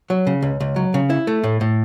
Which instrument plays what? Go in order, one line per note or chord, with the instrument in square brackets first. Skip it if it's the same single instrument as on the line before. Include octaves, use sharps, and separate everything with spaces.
[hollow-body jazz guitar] F#3
C#3
C#2
C#2
F#3
C#3
E4
A3
A2
A2